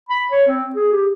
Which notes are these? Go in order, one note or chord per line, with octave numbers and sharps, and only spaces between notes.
B5
C#5
C4
G#4
G4